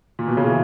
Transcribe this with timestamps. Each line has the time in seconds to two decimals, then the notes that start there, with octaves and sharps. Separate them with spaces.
0.19 A#2
0.28 B2
0.37 C#3
0.47 E3